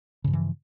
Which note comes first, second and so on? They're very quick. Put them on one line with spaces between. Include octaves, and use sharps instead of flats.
C#3 G2 F3 E3